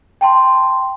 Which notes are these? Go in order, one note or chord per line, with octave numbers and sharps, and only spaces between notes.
G5 A5 C6